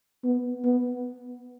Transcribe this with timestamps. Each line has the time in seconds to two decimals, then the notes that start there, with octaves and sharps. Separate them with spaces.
0.24 B3
0.65 B3